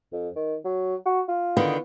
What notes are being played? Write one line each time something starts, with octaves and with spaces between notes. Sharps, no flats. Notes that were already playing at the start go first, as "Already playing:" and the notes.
F2
D#3
F#3
F#4
F4
D3 D#3 B3